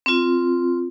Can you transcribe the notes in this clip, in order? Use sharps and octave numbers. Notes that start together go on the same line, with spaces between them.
C4 F4